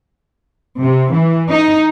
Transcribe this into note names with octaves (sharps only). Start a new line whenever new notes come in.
C3
E3
D#4